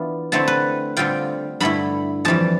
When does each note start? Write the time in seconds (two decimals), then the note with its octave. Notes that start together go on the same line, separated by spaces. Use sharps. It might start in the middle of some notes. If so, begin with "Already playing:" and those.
Already playing: E3 B3 D4 F4
0.32 D3 A3 C4 E4 A5
0.48 B4
0.97 D3 G3 C4 F4 G5
1.60 G2 D3 A3 E4 B5
2.25 F2 E3 G3 A5